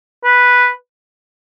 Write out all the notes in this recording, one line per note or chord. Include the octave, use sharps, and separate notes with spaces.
B4